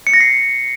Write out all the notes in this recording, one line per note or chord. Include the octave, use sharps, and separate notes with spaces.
C#7
A#6
C7